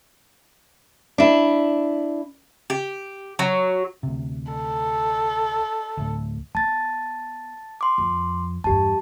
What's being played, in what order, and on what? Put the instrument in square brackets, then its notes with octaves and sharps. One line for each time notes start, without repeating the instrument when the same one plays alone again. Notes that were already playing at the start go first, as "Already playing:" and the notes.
[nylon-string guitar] D4 E4
[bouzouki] G4
F#3
[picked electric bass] D2 C3
[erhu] A4
[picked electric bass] D2 A2
[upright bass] B3 [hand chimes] A5 A6
[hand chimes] C6 D6
[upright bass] F2
[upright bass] E2 G2 [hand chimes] G4 A5